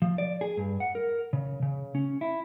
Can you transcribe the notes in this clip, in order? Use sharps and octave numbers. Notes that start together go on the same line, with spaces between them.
F3
D5
G#4
G2
F#5
A#4
C#3
C#3
C#4
E4